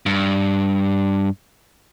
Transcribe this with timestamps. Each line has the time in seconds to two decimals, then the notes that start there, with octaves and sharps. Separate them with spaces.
0.06 G2